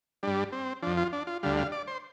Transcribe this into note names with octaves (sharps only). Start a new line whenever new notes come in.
G2 G3 D4
C4
F2 F3 D4
F4
D4
F4
D2 D3 G3 F5
F5
D5
C5